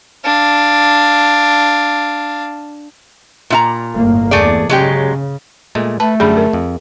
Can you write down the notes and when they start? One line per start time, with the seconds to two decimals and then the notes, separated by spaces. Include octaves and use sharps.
0.25 D4 F5
3.50 A#2 E4 A#5
3.93 G1 A2 A#3
4.31 E2 A3 G#4 D5
4.70 C#3 F#3 G#3 G4
5.75 A#2 G#3 A3
6.00 A3 B4 A5
6.20 F#2 D3 G3 G#4 B5
6.37 A#4
6.53 F2